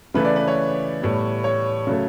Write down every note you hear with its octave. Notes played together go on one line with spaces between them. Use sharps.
C#3 E3 A3 B4
D5
B4
C#5
A2 G3 B3
C#5
C#3 F#3 A3